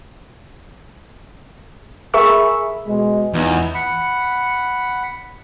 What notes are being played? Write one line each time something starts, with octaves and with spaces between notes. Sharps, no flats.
G#4 A#4 E5 B5 C#6 E6
B2 G#3
E2 B3 D#4 F4
F#5 B5